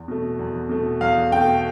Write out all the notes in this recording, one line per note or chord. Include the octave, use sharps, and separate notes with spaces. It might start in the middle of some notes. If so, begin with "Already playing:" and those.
Already playing: E2
B2 A3
E2
B2 A3
E2 F5
B2 A3 G5